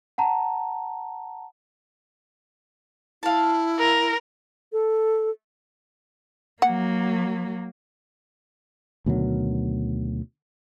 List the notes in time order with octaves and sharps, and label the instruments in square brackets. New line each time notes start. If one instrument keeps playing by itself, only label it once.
[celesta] F#5 A5 A#5
[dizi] E4 [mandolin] F5 A5
[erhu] A#4
[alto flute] A4
[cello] F#3 A#3 [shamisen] F#5
[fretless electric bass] D2 B2 D#3 F#3